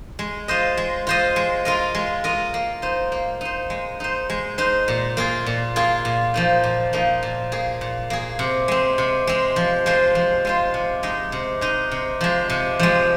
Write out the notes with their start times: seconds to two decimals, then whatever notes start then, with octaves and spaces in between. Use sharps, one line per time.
0.19 G#3
0.48 F4 C5 D#5
0.77 G#3
1.07 F4 C5 D#5
1.36 G#3
1.65 F4 A#4 D#5
1.95 G#3
2.24 F4 A#4 D#5
2.54 A#3
2.82 D#4 C5
3.12 A#3
3.41 D#4 C5
3.70 G#3
4.00 D#4 C5
4.30 G#3
4.58 D#4 C5
4.88 A#2
5.17 A#3 F4 G#4
5.46 A#2
5.76 A#3 F4 G#4
6.05 A#2
6.34 F3 A#3 D#4
6.64 A#2
6.93 F3 A#3 D#4
7.23 A#2
7.52 A#3 G#4
7.81 A#2
8.10 A#3 G#4
8.39 C3
8.68 G#3 C4
8.98 C3
9.27 G#3 C4
9.56 F3
9.86 G#3 F4 C5
10.15 F3
10.45 G#3 F4 C5
10.74 C3
11.03 G#3 D#4
11.32 C3
11.61 G#3 D#4
11.91 C3
12.21 F3 G#3
12.50 C3
12.79 F3 G#3